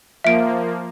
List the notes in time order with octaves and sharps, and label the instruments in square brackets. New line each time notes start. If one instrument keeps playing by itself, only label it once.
[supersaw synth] F3 A#3 [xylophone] E5 D7